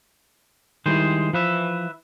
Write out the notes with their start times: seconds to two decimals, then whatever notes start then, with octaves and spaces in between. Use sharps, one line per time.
0.86 D#3 G3 G#3 E4 C5
1.33 E3 F3 B4 E5